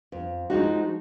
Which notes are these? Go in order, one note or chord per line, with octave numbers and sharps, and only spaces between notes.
F2
F3 G#3 D#4 F#4